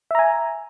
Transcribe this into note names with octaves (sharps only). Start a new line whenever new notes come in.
E5 G#5 A#5